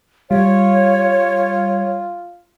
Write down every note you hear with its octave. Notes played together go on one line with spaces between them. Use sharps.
G3 F4 C#5